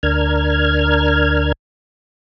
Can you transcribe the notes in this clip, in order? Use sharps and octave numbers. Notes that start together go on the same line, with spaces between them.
D2 D4 A#4 F6 G#6